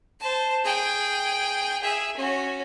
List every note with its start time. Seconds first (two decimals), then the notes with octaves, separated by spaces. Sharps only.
0.20 C5 A5
0.65 G#4 G5
1.82 G#4 E5
2.16 C#4 F#4